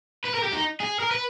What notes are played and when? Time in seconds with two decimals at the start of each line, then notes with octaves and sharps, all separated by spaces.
0.24 B4
0.34 A#4
0.43 G4
0.52 D#4
0.80 G#4
1.00 A#4
1.11 B4